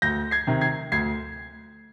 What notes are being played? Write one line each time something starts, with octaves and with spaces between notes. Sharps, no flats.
D2 G6 A#6
G#6 C7
C3 D#3
G#6 C7
D2 G#6 C7